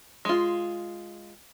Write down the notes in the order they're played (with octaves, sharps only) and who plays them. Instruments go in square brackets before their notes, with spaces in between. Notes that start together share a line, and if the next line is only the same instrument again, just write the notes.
[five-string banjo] G#3 F4